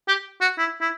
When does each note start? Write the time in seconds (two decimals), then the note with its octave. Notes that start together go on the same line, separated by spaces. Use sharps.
0.08 G4
0.41 F#4
0.58 E4
0.81 E4